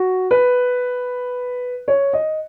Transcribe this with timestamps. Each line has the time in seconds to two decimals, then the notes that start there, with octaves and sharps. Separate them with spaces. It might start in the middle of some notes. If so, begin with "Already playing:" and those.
Already playing: F#4
0.31 B4
1.88 C#5
2.13 D#5